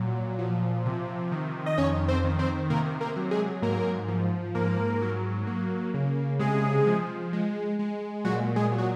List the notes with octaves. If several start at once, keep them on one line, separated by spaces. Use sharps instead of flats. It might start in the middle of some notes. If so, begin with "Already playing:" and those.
Already playing: A#2 F#3
F3
C3
D#3
D#5
F2 C#4 C#5
C4 C5
D#3
C4 C5
C3 A#3 A#4
A#3 A#4
F#3
G#3 G#4
G#2 A#3 A#4
F3
G#2 A#3 A#4
F#3
A#3
C#3
C3 G#3 G#4
F3
G#3
G#3
A#2 F#3 F#4
G#3 G#4
F#3
F#4